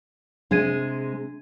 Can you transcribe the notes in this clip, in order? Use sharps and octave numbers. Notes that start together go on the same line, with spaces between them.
C3 G#3 D4 G#6 D#7